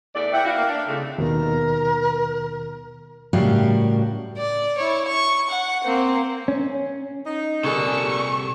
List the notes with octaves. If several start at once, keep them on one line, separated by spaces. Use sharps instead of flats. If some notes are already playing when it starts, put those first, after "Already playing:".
E2 A3 D5
E3 E5 F#5 G5
E4 F#4 F5
A#3
D4
F2 G#2 C#3 A3
D#2 B2 D#3 A#4
A2 C#3 G3 F#4 A#4 F5
D5
E4 C#5
C#6
F#5
A#3 C4
C#4
D#4
C2 A#2 D3 G3 G#4 A4 C#6